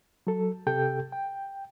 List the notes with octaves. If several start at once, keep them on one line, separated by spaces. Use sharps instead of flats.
F#3 A4
C3 G4 A4 G5 G6
G5